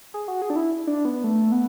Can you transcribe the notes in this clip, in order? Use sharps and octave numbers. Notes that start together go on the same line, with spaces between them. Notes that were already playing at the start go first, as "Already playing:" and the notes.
G#4
F#4
G#4
D4
E4
D4
B3
A3
B3